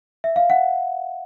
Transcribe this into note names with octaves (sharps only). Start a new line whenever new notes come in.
E5
F5
F#5